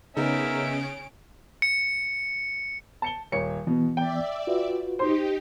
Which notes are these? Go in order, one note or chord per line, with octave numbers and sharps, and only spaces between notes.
C#3 B3 C#4 D#4 A#4 E5 D7
C#7
A5 C#7 G7
D#1 C#5 C#7
B2 E3 B3
D5 E5 G5
F4 F#4 B4
D#4 G4 C5 C6